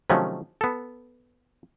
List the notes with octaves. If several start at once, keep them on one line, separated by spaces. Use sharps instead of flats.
C3 D#3 F3 F#3 A3 C#4
B3 A4